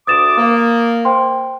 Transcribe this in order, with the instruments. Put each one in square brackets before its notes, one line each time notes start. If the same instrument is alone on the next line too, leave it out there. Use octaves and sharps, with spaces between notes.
[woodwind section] D2 D6 [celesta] D#6 A6 E7
[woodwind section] A#3
[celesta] C5 G5 C6